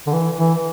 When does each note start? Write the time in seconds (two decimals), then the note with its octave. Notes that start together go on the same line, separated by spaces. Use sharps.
0.07 D3
0.13 E3
0.36 E3